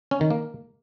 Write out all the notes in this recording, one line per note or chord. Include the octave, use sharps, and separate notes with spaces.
C#4
D#3
A#3